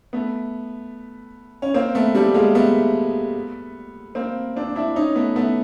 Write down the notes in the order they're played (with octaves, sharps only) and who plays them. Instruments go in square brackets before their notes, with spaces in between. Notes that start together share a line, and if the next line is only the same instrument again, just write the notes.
[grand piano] A3 B3
C#4
A#3 C4
A3 B3
G3 A3
G#3 A#3
A3 B3
A#3 C4
C4 D4
D4 E4
C#4 D#4
A3 B3
A3 B3